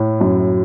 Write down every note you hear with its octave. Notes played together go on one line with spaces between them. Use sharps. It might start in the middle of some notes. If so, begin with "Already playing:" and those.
Already playing: A2
F#2